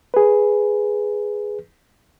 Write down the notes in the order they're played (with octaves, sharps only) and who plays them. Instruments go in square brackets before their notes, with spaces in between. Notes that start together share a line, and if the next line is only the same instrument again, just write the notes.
[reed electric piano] G#4 B4